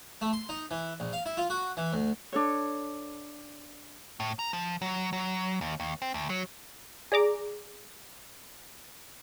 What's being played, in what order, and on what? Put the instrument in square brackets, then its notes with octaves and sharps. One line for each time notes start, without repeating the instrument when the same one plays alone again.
[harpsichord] A3
C6
D#4
E3
A#1
F5
E4
F4
F#4
E3
D2
[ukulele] D4 A4 C#5
[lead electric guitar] A2
A#5
F3
F#3
F#3
D#2
D#2
C4
D2
F#3
[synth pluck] G#4 D5 A#5 D6